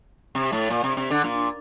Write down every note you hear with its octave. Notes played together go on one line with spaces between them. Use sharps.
C3
A2
A#2
C3
C3
D3
A#2